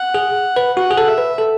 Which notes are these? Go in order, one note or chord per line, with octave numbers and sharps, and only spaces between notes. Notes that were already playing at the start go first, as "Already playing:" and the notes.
Already playing: F#5
G#4
B4
F#4 F#5
G#4
A4
E5
B4
A4